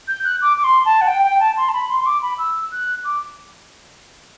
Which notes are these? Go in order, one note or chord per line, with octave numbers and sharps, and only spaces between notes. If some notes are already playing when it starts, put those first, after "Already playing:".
G6
F#6
D6
D6
C6
A5
F#5
G5
G5
A5
C6
A5
B5
C6
C6
D6
B5
E6
F#6
D6